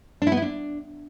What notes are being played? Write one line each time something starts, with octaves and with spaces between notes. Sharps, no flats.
D4
E4
B3
E4
D4